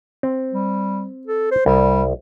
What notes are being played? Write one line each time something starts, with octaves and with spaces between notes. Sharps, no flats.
C4
G3
A4
C5
C2 G3